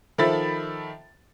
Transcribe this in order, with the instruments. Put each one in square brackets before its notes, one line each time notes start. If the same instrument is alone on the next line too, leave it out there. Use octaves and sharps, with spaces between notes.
[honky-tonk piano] D#3 F3 A4 E5 B5 A6